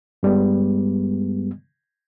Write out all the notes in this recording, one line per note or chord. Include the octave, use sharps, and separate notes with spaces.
G2 G3 G#3 B3